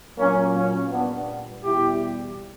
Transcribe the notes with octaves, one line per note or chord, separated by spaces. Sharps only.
A#2 F#3 A#3 C#4
A#3 C#4
A#2 G3 B3 D4
E2 B2 G3 E4 G4